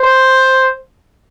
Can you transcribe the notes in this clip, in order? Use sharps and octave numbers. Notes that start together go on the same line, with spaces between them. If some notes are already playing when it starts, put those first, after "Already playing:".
Already playing: C5